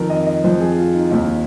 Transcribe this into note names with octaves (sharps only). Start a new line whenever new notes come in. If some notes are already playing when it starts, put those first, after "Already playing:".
Already playing: F2 D#3 A#4
D#5
D#5
F2 F3 C5
G#4
F4
D#4
D#2 D#3 D#4